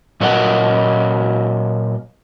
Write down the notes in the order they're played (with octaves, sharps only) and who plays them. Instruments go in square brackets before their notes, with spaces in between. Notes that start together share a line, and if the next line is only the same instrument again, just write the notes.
[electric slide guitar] A#2 F#3 F#4 A#4 D#5 F#5